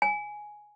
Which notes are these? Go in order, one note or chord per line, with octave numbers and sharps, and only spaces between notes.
G#5